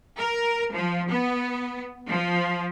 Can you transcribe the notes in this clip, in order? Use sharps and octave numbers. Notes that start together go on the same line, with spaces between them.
A#4
F3
B3
F3